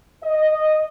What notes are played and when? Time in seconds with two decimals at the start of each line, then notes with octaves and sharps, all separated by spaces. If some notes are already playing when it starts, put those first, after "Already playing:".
0.23 D#5